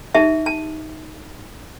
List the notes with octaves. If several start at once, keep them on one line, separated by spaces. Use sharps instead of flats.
D#4 G4 E5 A5
A5